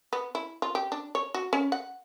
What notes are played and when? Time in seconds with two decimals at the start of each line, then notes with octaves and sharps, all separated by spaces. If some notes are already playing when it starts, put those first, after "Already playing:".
0.13 B3
0.35 E4
0.62 F4
0.75 G4
0.92 D4
1.15 C#5
1.34 F#4
1.53 C#4
1.72 F#5